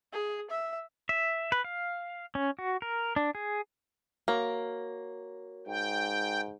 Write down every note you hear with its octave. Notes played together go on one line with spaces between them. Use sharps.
G#4
E5
E5
B4
F5
C#4
F#4
A#4
D4
G#4
A#3 F#4 A#4 C#5
G#2 G5